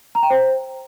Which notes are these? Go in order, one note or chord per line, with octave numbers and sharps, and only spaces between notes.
A#5
G5
C5